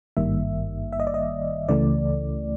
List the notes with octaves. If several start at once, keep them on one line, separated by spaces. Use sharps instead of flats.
G#1 G2 D#3 G3 A#3 E5
E5
D#5
D5
D#5
C#2 C#3 E3 A3 D5